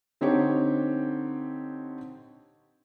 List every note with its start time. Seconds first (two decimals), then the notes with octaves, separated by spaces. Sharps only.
0.21 D3 C4 D#4 G4 C#5